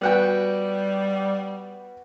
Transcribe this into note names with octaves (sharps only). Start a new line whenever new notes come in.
G3 B3 F#4 G5